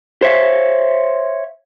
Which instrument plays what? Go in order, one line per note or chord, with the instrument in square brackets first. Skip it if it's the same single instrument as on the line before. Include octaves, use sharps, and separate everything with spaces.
[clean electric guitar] C5 C#5 E5 F5